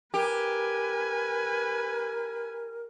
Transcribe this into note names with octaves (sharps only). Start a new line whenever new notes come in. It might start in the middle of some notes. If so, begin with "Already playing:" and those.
G4 A#4 B4 G#5